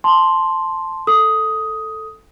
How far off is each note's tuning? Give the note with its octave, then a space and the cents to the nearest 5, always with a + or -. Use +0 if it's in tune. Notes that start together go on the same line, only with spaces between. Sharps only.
A5 +0 C6 +0
A4 +0 D#6 +10